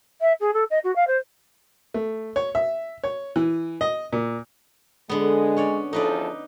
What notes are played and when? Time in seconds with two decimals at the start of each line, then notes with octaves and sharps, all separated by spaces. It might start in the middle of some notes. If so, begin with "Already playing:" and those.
0.21 E5
0.40 G#4
0.54 A4
0.70 D#5
0.84 F#4
0.96 F5
1.07 C5
1.94 A3
2.36 C#5
2.55 E5
3.04 C#5
3.36 E3
3.81 D#5
4.13 A#2
5.10 D3 G#3 B3
5.57 C#4 C#5 D5
5.93 E2 F3 D#4 A4 B4 D5